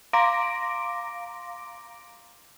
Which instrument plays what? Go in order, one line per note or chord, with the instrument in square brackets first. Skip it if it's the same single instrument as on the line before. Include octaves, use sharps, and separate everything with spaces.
[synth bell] F5 A#5 C6 D6 A#6 D7